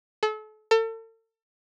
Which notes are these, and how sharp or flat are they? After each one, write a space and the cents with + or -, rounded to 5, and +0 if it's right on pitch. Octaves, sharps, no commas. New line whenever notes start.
A4 -35
A4 +40